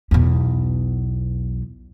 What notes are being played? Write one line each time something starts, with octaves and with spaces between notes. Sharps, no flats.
B1 E2